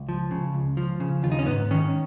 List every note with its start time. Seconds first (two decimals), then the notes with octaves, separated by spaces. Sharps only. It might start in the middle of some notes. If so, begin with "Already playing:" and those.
Already playing: C#2
0.09 F3
0.31 C#3
0.54 C#2
0.77 F3
1.00 C#3
1.23 D#2 F4
1.32 D#4
1.39 C#4
1.47 G#2 B3
1.71 D#3 C#4